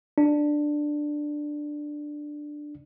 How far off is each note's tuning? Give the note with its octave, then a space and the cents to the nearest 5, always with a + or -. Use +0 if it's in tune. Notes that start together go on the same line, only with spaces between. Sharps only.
D4 +10